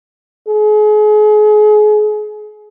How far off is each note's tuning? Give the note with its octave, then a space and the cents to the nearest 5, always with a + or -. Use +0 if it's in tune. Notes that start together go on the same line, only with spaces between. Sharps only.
G#4 +35